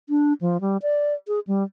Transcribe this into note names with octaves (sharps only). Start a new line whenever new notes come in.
D4
F3
G3
D5
G#4
G3